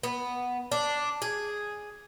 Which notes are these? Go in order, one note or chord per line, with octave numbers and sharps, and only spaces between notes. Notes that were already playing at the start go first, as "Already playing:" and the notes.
B3
D4
G#4